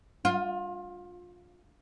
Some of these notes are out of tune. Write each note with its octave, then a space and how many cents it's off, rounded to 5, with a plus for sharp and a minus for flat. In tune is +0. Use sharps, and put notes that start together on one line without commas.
F4 +25